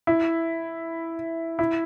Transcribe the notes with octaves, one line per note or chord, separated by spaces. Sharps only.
E4
E4